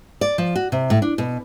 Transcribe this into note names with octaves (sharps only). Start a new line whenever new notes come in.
D5
F3
F#4
C3
A2
D4
B2